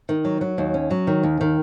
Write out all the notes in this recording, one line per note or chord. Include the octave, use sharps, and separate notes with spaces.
D#3
F#3
F#3
D#2
C#4
F#3
D#3
D#2
D#3